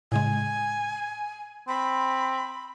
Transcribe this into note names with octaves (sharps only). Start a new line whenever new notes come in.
A2 C#3 G#3 G#5
C4 B5